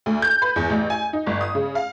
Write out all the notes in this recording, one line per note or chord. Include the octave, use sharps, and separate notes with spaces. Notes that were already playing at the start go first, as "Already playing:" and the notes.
D2
G6
B4
E2
A1
G#5
D#4
G1
D#6
C#3
F5